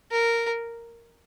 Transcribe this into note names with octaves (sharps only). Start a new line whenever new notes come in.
A#4